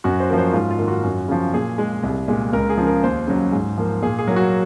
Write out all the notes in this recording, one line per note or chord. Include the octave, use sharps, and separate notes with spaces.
F#2 F#4
C5
F3 A#3
C5
G#2 F4
F4
D#3 A#3
F#4
F#2
C#3 F3
A#2 G#4
G#3
C2
A#2 G#3
C#2 A#4
G#4
C#3 F3
A#4
D#2 C5
C#3 F#3
G#2
F3 A#3
A#2 G#4
G#4
F#3 A#3
F#4